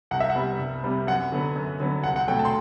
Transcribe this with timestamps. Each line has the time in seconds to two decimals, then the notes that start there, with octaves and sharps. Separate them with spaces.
0.11 C2 F#5
0.20 E5
0.30 F#5
0.35 C3 G3 B3
0.59 C2
0.84 C3 G3 B3
1.07 F#2 F#5
1.32 D3 F#3 B3
1.56 F#2
1.80 D3 F#3 B3
2.04 C2 F#5
2.16 F#5
2.28 B2 F#3 A3 G5
2.39 A5
2.45 C6